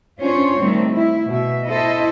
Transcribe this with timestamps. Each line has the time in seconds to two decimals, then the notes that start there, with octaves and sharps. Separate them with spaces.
0.20 C#4 D4 F4 C5 C#5
0.58 D#3 G3 A3 C4
0.94 E4
1.30 B2 E5
1.68 E4 A4 C5 D#5